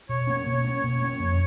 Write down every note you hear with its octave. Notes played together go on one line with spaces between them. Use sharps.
B2 C#5
A#3 C#4
B2
A#3 C#4
B2
A#3 C#4
F2